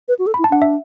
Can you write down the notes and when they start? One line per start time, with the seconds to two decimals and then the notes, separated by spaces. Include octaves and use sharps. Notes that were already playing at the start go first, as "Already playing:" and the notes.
0.08 B4
0.19 F#4
0.27 A4
0.34 B5
0.39 E4
0.44 A5
0.50 D4 F#5
0.62 E5